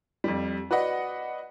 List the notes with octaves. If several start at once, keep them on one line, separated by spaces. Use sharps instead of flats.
F2 G3
F#4 B4 D5 D#5 F#5